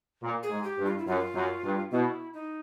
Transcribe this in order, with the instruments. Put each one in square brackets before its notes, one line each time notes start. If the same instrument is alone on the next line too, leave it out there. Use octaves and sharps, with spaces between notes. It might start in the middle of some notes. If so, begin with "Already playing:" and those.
[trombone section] A#2
[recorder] G#4
[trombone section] G#2
[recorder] G4
[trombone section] G2
[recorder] F4
E4
[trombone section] F#2 [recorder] F4
[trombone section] F#2
G2
[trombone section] B2 [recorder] E4
[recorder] D#4